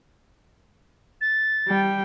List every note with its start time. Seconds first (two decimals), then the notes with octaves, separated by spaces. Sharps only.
1.21 A6
1.68 G3 G5